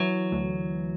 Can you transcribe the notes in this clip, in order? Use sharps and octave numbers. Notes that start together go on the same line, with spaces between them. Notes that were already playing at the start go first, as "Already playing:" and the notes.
Already playing: E3 F#3
D2